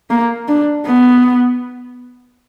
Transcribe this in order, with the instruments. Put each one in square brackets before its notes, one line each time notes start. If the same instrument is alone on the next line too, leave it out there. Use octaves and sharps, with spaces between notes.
[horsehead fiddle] A#3
D4
B3